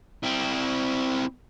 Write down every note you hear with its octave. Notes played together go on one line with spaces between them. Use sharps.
C4 E4